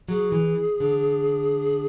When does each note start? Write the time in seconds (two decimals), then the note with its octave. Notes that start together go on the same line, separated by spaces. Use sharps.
0.08 F#3 G#4
0.32 E3
0.80 D3